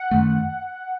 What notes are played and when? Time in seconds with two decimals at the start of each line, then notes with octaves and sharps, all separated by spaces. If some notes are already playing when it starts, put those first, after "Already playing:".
Already playing: F#5
0.11 F#2 D#3 A3